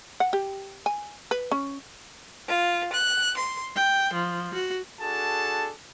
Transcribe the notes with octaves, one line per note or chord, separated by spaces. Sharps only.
F#5
G4
G#5
B4
C#4
F4
F#6
C6
G5
F3
F#4
D4 F#4 G#4 A4 A5